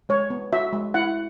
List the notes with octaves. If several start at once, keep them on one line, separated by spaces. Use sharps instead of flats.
G#3 C#5
B3
F#4 E5
G#3
E4 F#5